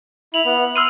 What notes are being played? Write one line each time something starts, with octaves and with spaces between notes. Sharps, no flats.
E4 F7 F#7
B3
C6 E6 F6 D#7